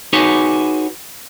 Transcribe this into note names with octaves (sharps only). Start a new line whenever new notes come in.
D#4 F#4 G#4 B4 C#5